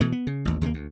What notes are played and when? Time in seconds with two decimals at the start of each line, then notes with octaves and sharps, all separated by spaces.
0.01 B2 E3 A3
0.12 B3
0.27 C#3
0.45 A1 D#2
0.61 D#2 C#3 G#3 A#3
0.74 D2